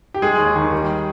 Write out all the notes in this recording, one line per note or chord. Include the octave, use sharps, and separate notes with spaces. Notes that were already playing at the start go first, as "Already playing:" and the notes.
G4
G#3 G#4
D#2
D#3
G3